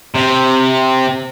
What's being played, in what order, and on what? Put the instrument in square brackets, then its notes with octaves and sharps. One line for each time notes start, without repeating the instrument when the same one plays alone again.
[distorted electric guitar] C3